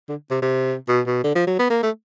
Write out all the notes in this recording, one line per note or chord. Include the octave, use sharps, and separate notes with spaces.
D3
C3
C3
B2
B2
D3
F3
F#3
B3
A#3
A3